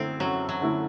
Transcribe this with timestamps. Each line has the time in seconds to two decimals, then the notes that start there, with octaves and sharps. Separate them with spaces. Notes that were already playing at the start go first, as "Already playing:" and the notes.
Already playing: F#2 D3 A3 C4 E4
0.20 F#2 F#3
0.49 F#3
0.62 D3 A3 E4